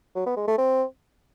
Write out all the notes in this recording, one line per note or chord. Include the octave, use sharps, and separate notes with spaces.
F#3
B3
G#3
A3
C4